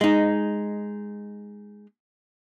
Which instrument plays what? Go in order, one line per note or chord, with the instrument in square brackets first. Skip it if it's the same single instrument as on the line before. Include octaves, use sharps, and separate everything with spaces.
[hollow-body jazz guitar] G#3 D#4